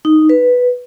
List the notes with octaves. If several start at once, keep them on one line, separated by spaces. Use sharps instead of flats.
D#4
B4